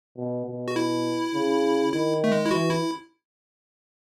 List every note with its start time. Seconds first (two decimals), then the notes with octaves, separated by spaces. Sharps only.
0.17 B2
0.46 B2
0.68 F#4
0.76 E4
1.34 C#3
1.92 D#3 E4
2.24 A3
2.32 G#3
2.46 E4
2.51 E3 F#4
2.70 E4